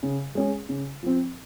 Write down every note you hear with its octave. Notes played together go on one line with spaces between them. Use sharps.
C#3
G#3 C#4 G#4
C#3
F3 C4